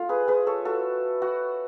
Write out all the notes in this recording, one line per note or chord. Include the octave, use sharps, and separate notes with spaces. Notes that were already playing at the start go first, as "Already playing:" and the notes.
Already playing: A3 F4
G#4 B4
G#4 B4
A4 C#5
F#4 A4
F#4